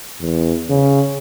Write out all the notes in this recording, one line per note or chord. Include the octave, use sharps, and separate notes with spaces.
E2
C#3